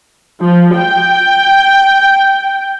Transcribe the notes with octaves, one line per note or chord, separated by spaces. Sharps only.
F3
G5